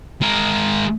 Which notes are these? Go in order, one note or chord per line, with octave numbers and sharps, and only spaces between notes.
G#3 A#4